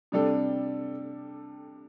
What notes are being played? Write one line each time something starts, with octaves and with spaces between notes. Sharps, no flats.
C3 G3 D4 A4